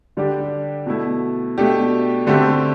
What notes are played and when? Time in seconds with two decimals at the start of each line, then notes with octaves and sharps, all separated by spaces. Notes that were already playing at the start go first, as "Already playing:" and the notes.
0.17 D3 G3 D4 G4
0.86 B2 A3 E4
1.58 B2 A3 D4 G4
2.27 D3 A3 C4 G4